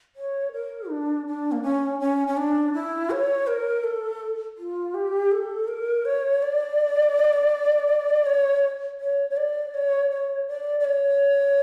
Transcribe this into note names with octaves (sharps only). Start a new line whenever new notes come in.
C#5
A#4
D4
D4
A#3
C#4
C#4
C#4
D4
E4
C#5
A#4
A4
F4
G4
A4
A#4
C#5
D5
C#5
C#5
C#5
D5
C#5
C#5
D5
D5
C#5